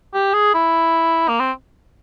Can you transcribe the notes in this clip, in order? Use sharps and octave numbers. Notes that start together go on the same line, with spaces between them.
G4
G#4
E4
A#3
C4